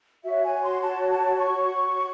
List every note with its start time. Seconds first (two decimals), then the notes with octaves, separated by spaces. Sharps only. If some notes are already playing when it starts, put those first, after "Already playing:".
0.24 F#4 C#5 E5
0.43 G#5
0.62 C6
0.81 A5
1.10 A5
1.38 C#6